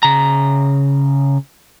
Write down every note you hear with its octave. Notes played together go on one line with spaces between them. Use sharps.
C#3 A#5